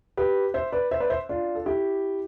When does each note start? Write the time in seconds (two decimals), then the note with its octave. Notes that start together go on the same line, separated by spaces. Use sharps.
0.17 G4 B4
0.54 C5 E5
0.72 B4 D5
0.91 C5 E5
1.00 B4 D5
1.10 C5 E5
1.29 D4 F4
1.55 A4
1.66 E4 G4